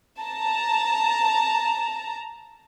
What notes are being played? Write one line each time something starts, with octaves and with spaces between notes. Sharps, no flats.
A5 A#5